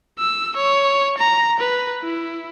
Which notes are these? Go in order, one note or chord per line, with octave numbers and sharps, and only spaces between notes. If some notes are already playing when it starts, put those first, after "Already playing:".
E6
C#5
A#5
B4
E4